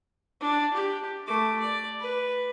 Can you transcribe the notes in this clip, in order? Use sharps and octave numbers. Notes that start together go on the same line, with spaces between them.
D4
G4
A3 D6
D5
B4